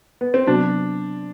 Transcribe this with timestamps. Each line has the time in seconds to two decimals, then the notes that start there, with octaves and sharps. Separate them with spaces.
0.21 B3
0.34 C4
0.47 C3 F#3 B3 D4 F#4